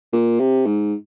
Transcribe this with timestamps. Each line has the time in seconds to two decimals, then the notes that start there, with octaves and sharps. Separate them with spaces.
0.13 A#2
0.40 C3
0.66 G#2